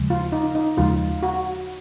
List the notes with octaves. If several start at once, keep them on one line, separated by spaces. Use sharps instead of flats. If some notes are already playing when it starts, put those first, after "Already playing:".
Already playing: D#2 C#3 F3 G#3
F4
D#4
D#4
D#2 C#3 F3 G#3 F4
F#4